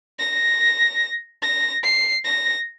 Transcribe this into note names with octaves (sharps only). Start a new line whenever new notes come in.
A#6
A#6
C7
A#6